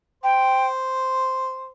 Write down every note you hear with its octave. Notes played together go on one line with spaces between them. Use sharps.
C5 G5